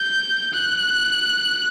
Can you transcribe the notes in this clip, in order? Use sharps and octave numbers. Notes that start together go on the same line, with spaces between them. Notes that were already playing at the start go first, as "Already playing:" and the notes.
Already playing: G6
F#6